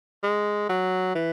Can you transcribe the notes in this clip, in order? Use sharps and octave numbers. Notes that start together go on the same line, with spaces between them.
G#3
F#3
E3